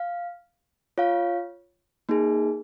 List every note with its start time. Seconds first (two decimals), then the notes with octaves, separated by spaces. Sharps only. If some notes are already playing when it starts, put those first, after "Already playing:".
Already playing: F5
0.98 F4 C#5 F5
2.09 A#3 D#4 G#4